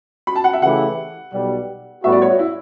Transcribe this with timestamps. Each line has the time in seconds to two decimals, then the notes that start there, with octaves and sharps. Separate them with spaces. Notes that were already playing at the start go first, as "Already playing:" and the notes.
0.27 B5
0.36 A5
0.44 F#5
0.53 E5
0.62 C#3 E3 A3 E4 G4 F#5
1.32 B1 B2 G3
2.03 A2 G3 B3 F#4 E5
2.12 D5
2.22 C#5
2.30 F#4
2.39 E4